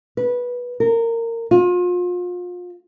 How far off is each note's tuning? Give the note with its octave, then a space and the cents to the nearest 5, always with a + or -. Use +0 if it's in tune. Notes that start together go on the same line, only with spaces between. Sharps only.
B4 -15
A#4 -20
F4 +35